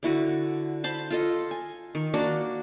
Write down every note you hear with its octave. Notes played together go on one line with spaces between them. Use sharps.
D3 E4 F#4 B4
C5 A5 B5 C6
F4 A4 D#5
G#5
D#3
A#3 D4 F#4